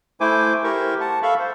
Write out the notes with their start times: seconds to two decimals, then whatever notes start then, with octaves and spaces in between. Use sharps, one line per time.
0.21 A3 E4 C5 G#5 D6
0.64 E4 G4 A#4 C5 C#6
1.00 F#5 A5
1.23 A4 E5 F5 B5 C#6
1.39 C5